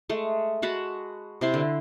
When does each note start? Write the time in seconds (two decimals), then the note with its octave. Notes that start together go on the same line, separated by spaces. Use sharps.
0.09 G#3 A3
0.62 G#3 F#4 A5 B5
1.41 C3 E4 C6
1.54 D3